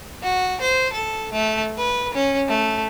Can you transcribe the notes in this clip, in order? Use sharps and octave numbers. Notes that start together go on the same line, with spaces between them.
F#4
C5
A4
A3
B4
C#4
A3